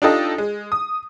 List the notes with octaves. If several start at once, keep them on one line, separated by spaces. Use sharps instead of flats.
D4 D#4 F4 G4 A4 D#5
G#3
D#6